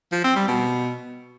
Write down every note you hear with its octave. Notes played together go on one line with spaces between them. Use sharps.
F3
C4
G3
B2